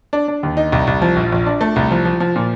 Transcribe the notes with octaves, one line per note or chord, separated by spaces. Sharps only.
D4
D4
D#2
D#4
C2
C2
F3
A#1
A#1
D4
A3
C2
F3
F3
F3
A#2